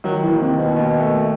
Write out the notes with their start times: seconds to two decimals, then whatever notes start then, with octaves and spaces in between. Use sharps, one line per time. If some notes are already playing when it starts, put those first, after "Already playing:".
0.04 D#3 F#3
0.23 E3
0.28 D#2
0.40 C3
0.53 D#2
0.58 B2
0.76 D#2
1.00 A3